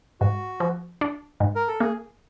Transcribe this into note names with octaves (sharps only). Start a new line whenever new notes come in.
G#2 F#4
F3
D4
G#2
A#4
A4
A#3 G#4